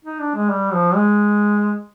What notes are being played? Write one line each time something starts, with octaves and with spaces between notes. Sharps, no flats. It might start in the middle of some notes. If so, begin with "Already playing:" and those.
D#4
D4
G#3
G3
F3
G#3